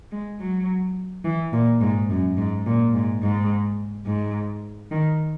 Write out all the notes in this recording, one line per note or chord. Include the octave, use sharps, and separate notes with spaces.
G#3
F#3
E3
A#2
G#2
F#2
G#2
A#2
G#2
G#2
G#2
D#3